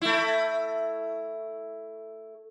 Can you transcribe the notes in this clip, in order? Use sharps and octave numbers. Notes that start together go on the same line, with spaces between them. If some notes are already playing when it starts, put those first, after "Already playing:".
A3 E4